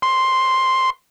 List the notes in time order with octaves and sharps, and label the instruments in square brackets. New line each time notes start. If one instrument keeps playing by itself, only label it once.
[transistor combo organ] C6